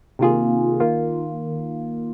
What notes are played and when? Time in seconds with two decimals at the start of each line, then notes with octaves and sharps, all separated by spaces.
0.19 C3 D#3 A#3 F4 G#4
0.80 D#3 A#3 F4